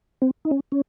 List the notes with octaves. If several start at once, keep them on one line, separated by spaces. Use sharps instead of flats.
C4
D#4
C#4
C#4